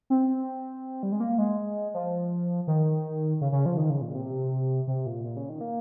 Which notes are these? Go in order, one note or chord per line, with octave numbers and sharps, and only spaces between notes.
C4
G3
G#3
A#3
G#3
F3
D#3
C#3
C#3
F3
D#3
C#3
A#2
C3
C3
A#2
A#2
C#3
D#3
A#3